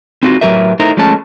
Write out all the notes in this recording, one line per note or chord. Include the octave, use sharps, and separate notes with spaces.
C4 D#4 F4 F#4
A2 F#3 G4 A#4 B4 E5
A3 D#4 E4 A#4 C5 A#5
F3 G#3 A3 C#4 A5